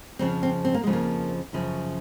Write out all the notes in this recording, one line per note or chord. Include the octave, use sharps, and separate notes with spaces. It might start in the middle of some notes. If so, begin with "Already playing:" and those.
F2 C#3 F3 C4
C4
C4
A#3
F2 C#3 F3 G#3
A#3
F#2 C#3 F3